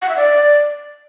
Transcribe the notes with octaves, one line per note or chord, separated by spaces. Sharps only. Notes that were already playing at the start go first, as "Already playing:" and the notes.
F#5
E5
D5